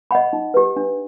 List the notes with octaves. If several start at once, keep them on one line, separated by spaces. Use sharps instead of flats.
D#5 F#5 B5
D#4
G4 B4
D4